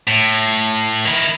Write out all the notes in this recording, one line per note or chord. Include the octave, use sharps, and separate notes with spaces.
A2
D#3 E4